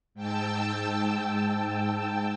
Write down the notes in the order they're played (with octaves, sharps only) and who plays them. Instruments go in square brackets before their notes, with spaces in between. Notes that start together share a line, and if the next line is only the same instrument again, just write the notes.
[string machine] G#2 G5 A5 E6